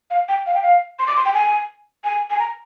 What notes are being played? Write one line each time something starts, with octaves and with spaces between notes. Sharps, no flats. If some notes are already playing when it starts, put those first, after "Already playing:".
F5
G5
F5
G5
F5
C6
D6
C6
G5
G#5
G#5
G#5
A#5